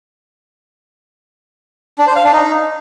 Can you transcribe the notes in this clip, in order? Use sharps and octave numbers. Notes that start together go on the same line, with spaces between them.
D4
C5
F5
D4
D#4